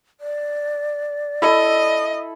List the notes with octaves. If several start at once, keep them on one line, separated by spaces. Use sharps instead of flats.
D5
E4 A4 D#5